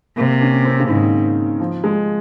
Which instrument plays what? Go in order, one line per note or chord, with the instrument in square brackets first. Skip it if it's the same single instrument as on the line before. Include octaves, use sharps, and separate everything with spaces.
[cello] C3 [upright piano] A#3
[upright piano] C#4
C4
C#3
[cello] G#2 [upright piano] D#3
[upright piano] F3
G#3